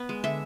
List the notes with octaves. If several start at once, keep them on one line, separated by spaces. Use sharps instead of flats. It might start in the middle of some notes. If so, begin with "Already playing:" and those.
Already playing: B3
G#3
D3 E5